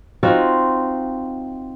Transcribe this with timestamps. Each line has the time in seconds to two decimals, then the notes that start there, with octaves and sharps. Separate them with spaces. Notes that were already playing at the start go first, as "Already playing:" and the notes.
0.23 C4 D#4 F4 F#4